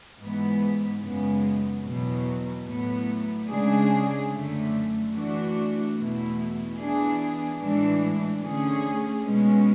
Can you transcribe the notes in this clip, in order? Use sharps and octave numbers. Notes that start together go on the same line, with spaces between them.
G#2 E3 G#3 B3
F#2 C#3 G#3 B3
E2 B2 F#3
A2 F#3 B3
C#3 G#3 D4 G#4
F#2 D3 A3
E3 A3 D4 F#4
E2 B2 A3 E4
E3 B3 D4 G#4
A2 E3 G#3 D4
D3 A3 C#4 G#4
B2 G#3 C#4